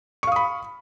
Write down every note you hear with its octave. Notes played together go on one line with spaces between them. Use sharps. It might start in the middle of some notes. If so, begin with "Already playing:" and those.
F5 B5 C#6 D#6